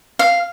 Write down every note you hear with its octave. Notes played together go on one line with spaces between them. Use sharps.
F5